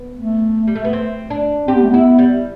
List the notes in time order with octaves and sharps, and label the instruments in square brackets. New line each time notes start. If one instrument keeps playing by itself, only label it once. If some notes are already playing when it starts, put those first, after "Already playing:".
Already playing: [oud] B3
[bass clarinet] A3
[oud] G3
A3
B3
C4
D4
[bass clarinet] C4 [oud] G4
[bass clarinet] B3
A3
[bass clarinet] B3 [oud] E4
[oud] G3